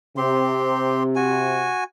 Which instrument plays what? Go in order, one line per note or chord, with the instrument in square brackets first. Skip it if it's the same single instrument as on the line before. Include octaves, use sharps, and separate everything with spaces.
[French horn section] C3 [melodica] C4 G4 C6
[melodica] F#4 G#5